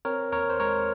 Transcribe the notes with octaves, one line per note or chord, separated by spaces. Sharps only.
C4 A#4 C#5
D#2 A#4 C#5
C5
G#3 A#4 C#5